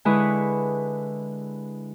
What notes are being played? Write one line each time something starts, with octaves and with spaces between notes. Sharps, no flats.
D3 G#3 E4 B4 C#6 D#6